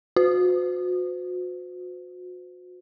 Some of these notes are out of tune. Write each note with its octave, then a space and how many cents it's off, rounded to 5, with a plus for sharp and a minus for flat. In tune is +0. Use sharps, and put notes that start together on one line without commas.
F#4 -35 C5 -45